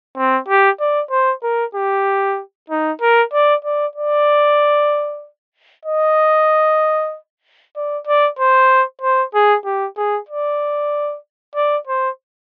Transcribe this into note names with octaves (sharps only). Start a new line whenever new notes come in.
C4
G4
D5
C5
A#4
G4
D#4
A#4
D5
D5
D5
D#5
D5
D5
C5
C5
G#4
G4
G#4
D5
D5
C5